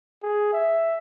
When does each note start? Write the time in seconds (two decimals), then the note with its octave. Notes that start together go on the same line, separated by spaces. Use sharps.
0.23 G#4
0.53 E5